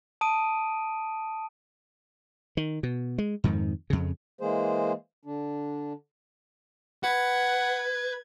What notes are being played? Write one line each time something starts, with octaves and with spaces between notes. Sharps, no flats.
A5 D#6 D7 D#7
D#3
B2
G#3
F2 G#2 D#3
F2 C#3
E3 G#3 A#3 G#4 C5
D3 D4
B4 F#5 G#6